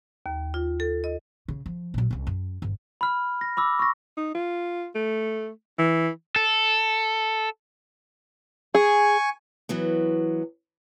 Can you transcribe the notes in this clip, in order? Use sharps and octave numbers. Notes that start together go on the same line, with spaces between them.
D#2
F4
A4
D#5
C#3
F3
A#2 F#3
C2 C#4
F#2
G1
B5 F6
A#6
B5 D6 E6
C#6 A#6
D#4
F4
A3
E3
A4
G#4 G#5 C#6
E3 F#3 B3